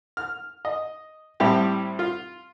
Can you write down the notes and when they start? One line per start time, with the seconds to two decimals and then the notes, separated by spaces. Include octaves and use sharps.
0.17 F6
0.65 D#5
1.40 A2 G3 C4 E4 G4
1.99 F4